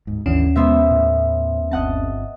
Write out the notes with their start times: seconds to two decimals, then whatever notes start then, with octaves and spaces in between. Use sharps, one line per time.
0.07 D1 G#2
0.26 G#1 D#2 D3 E3 C#4
0.56 B2 G#3 B3 C5 E5
0.91 A2
1.71 G1 C4 D#5 F#5 A5